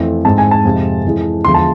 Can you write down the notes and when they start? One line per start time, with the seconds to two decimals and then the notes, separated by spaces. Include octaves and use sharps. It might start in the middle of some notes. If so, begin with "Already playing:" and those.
Already playing: F2 E3 A3 C4
0.25 G#2 G#3 C4 A5
0.38 G#5
0.51 A5
0.65 F2 C3 G#3 C4
1.05 F2 E3 G#3
1.45 E2 D3 F3 G#3 C6
1.54 A5